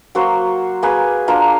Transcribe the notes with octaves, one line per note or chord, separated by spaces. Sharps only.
F#3 A#3 F#4 C5
A#3 G#4 B4
A#3 D4 F4 A#5